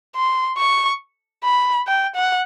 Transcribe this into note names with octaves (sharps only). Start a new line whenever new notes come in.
C6
C#6
B5
G5
F#5